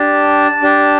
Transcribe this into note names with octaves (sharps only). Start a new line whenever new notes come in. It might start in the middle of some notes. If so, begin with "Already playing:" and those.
Already playing: D4 G4 A5
D4 G4